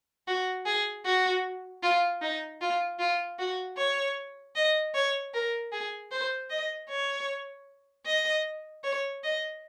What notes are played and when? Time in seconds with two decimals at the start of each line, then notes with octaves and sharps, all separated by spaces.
0.27 F#4
0.66 G#4
1.05 F#4
1.83 F4
2.22 D#4
2.61 F4
2.99 F4
3.39 F#4
3.78 C#5
4.55 D#5
4.95 C#5
5.34 A#4
5.72 G#4
6.11 C5
6.50 D#5
6.89 C#5
8.06 D#5
8.84 C#5
9.24 D#5